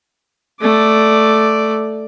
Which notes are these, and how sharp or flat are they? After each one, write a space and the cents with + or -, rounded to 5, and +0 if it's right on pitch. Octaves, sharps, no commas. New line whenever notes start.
A3 +0 D5 +0